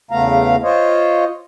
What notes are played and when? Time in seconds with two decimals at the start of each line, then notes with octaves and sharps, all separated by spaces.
0.11 E2 C#3 A3 B3 F5 A#5
0.63 F4 C5 C#5 D#5